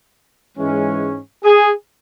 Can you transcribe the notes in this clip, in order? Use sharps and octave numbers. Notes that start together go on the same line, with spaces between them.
G#2 E3 G#3 C#4
G#4